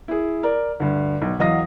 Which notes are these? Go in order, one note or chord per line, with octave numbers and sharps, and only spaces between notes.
E4 G#4
A#4 D5
D2 G2
B1
E2 F#3 D#5 F5 D#6 A#6